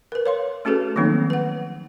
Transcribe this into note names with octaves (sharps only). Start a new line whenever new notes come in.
A#4 B4
C#5 F5 C6
A3 C#4 F#4 G#4 A4 B4
D#3 F3 F#3 A#3 C4 D#4
B4 F#5